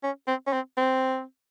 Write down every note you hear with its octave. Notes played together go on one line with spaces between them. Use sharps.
C#4
C4
C#4
C4
C4